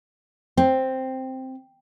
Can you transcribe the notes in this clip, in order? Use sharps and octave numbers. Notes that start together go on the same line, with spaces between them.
C4